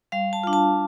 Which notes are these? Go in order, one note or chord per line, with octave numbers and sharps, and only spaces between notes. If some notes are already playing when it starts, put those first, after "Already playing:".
G3 F5
A5
D4 F4
A5